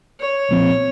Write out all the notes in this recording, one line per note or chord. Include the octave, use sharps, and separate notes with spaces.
C#5
C2 A#2 F3 C4